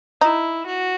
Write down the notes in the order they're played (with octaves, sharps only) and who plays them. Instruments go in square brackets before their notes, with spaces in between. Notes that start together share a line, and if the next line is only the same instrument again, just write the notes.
[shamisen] D#4 [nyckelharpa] E4
[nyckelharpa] F#4